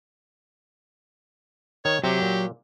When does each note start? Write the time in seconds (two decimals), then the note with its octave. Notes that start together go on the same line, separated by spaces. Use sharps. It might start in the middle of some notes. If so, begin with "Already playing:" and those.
1.85 D#3 C#5
2.04 C3 F#3 G4
2.22 A#2